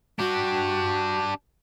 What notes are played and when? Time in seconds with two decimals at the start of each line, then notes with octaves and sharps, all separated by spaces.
0.19 D4 F#4 G4